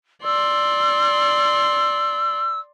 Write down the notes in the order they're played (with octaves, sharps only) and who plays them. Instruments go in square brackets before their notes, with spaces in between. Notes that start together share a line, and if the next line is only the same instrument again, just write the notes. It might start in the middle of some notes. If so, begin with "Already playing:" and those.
[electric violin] D5 C6 [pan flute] E6